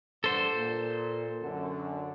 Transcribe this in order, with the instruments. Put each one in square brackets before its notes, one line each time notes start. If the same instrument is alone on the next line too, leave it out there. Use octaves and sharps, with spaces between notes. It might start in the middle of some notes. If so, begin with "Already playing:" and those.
[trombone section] G2 D3 [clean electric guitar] A4 C5
[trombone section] A#2
F#2 D3